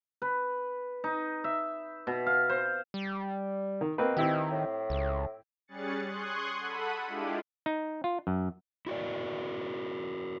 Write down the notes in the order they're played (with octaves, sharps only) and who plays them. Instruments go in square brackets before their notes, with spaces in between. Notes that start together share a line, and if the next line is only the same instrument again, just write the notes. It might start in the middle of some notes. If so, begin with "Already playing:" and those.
[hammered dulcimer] B4
D#4
E5
B2
F5
C5
[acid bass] G3
[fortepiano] D#3
[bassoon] B2 [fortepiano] A#3 C4 B4
[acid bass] D#3 [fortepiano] C4 E4 G4
[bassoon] A2
[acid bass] C#2
[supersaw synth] G3 C#4 G#4 F#6 A6 C#7
C6 C#6 D#6 F#6 G#6
A4 F#5 B5 D#7
G#3 D4 E4 F4 G4
[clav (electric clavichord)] D#4
F4
F#2
[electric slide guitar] E4 F#4 A#4 D5